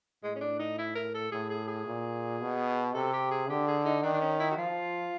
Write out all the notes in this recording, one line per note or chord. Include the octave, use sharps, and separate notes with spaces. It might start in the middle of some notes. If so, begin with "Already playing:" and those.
A2 G#3
C#4
D4
D#4
E4
A#4
A4
A2 G#4
G#4
G#4
A#2
B2
C3 A4
G4
G#4
D3 G4
G#4
D#4
D#3 D4
D4
C#4
E4
F#4
F3 F4